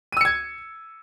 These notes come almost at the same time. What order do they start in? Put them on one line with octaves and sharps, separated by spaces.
D#7 E6 C#7 G#6